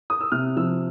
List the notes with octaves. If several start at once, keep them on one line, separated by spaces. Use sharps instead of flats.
D#6
E6
C3 F6
F3 E6